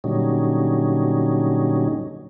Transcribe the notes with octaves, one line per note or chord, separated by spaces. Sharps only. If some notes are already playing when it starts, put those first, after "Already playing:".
A#2 D3 F#3 G3 C#4 D#4